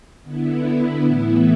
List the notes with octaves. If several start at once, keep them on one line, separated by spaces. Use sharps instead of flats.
D3 B3 E4
A2 E3 B3 E4